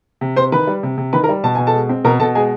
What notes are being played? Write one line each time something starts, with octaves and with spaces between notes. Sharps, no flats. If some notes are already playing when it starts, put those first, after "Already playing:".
C3
C3 C5 C6
D#3 B4 B5
G3
C3
C3
D#3 B4 B5
A#4 A#5
G3
B2 A5
B2 G#5
A4 A5
G#3
C4
B2 A#4 A#5
B2 A4 A5
G#3 G#4 G#5